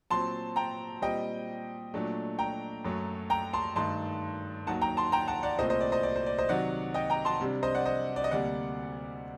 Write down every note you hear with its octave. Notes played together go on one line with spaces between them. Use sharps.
A#2 F#3 C4 A5 C6
G5 A#5
A#2 G3 C4 D#5 G5
A#2 F#3 A3 D4
G5 A#5
F#2 F#3 A3
G5 A#5
A5 C6
G2 D#3 A3 D#4 A5 C6
D#2 D#3 F#3 A#3 F#5 A5
G5 A#5
A5 C6
G5 A#5
F#5 A5
D5 F#5
C2 A#2 A3 C4 C5 D#5
C5 D#5
D5
C5 D#5
D5
C5
D5
C5 D#5
C3 D#3 F#3 D5 F#5
D#5 G5
G5 A#5
A5 C6
C3 G3 D4
C5 D#5
D5 F#5
C5 D#5
D5
D#5
D2 C3 G3 A#3 D5 F#5